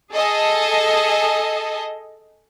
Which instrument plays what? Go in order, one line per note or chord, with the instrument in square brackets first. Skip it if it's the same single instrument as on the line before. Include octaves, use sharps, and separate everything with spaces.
[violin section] G#4 A4 D#5